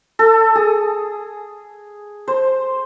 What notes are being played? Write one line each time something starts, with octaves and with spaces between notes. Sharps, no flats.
A4
G#4
C5